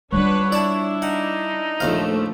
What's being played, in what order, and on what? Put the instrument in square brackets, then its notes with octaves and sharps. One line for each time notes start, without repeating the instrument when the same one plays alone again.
[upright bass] G3 F4 [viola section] D4 B4 F#5 [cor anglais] C#5
[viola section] D4 E4 [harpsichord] D5 A5
[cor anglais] D#4 [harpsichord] F#5
[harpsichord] A#1 D#2 F5 [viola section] F3 A3